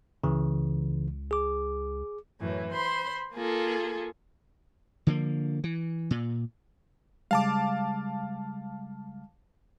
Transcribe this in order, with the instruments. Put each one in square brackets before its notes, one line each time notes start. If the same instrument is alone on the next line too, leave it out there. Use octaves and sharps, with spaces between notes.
[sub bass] C#2 [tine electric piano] C#3 E3
[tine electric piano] G#4 D6
[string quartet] F#2 A2 E3
C5 B5 C6
A#3 F4 G#4 A4
[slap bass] D3 F3 A#3
E3
A#2
[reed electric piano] C#3 G3 G#3 [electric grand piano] F5 A5 D6